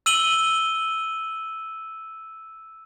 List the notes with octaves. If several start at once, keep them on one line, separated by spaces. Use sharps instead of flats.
E6 D#7 F#7 G7